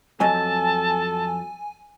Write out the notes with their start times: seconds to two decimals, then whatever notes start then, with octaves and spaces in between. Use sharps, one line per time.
0.20 F2 F#3 A4 D#5 G#5 A5